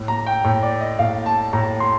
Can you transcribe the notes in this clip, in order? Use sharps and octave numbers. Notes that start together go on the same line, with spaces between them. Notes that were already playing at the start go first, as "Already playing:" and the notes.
Already playing: A2
A#5
G5
A2
D5
D#5
A2 F5
A5
A2 A#5
C6